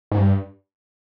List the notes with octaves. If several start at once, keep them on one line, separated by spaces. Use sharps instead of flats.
G#2
G2